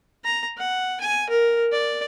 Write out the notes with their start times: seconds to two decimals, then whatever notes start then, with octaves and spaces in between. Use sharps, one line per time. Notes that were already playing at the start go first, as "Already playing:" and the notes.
0.24 A#5
0.58 F#5
1.00 G#5
1.30 A#4
1.72 D5